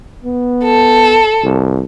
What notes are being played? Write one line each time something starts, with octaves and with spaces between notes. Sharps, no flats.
B3
A4
C2